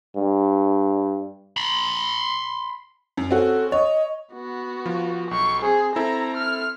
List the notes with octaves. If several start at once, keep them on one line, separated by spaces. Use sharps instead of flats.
G2
B5 C6
F#2
C4 C#4 F#4 A4
C#5 D#5
B3 F#4
F3
B1 C#6
C4 G#4 C5
C4 E4 A4 A#5
F6